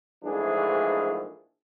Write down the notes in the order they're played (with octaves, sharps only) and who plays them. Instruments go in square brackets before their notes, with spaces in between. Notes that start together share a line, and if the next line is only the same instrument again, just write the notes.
[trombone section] A#1 G#2 E3 A3 D4 G#4